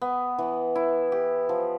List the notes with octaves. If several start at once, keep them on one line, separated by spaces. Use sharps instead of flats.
B3
E3
E4
G4
F3